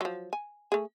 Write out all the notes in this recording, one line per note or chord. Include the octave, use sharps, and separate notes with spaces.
F3 F#3
G#5
A3 G#4